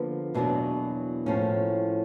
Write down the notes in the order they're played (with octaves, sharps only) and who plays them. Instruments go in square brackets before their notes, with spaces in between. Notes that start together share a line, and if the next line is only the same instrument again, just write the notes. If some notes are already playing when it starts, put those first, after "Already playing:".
Already playing: [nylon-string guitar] D3 F3 A#3 B3 B4
E2 B2 F#3 A#3 D4
A2 F3 A#3 C#4